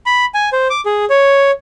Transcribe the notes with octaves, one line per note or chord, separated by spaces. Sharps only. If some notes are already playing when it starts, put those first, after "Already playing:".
B5
G#5
C5
D6
G#4
C#5